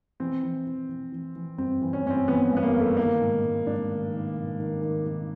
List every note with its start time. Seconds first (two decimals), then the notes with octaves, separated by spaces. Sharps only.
0.20 E3 C4
0.43 E3
0.67 E3
0.89 E3
1.12 E3
1.36 E3
1.58 G2 C4
1.82 E3
1.93 C#4
2.05 G2 C#4
2.10 C4
2.28 E3 B3
2.52 G2 B3
2.63 A#3
2.74 G2
2.80 A3
2.97 D#3 A#3
3.21 G#2
3.43 G#2
3.67 G#2 D4
3.89 D#3
4.13 D#3
4.36 G#2
4.60 D#3
4.82 D#3
5.06 D#3